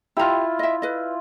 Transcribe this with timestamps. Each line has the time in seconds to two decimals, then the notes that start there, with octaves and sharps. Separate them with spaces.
0.17 E4 F4 G4 A#5
0.59 D#5 E5
0.82 B4 D#5